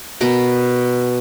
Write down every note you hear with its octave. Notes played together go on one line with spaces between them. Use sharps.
B2 A#4 F#5 B5